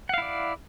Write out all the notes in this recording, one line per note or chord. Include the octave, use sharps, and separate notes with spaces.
E4 D5 F5 F#5